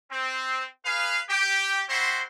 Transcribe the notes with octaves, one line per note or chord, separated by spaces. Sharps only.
C4
G#4 B4 F5
G4 G5
G3 C4 E4 F#4 C5 C6